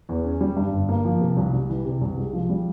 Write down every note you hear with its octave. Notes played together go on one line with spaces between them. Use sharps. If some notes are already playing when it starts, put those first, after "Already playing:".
E2
C#4
G3
G2
G1
A#3
F3
C3
C2
G3
E3
C3
C2
G#3
F3
G3